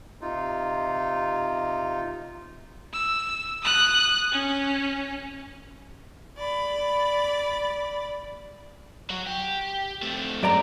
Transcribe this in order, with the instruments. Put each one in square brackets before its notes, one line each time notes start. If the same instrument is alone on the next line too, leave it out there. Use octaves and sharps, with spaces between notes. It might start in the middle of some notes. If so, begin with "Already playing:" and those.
[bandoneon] C3 D#4 F4
[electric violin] E6
D#6 F#6
C#4
[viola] D5 B5
[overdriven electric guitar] F#3 F#4
G4
A3 C4
[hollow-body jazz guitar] F#2 D5 A#5